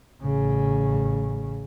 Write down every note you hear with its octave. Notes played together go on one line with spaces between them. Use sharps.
A1 C#3